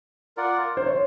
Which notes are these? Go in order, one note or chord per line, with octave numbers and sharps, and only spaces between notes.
F4 A#4 D5 F#5
C5
C#5